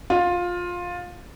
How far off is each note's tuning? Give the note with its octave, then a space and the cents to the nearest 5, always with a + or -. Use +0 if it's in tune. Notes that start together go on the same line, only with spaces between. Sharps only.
F4 +15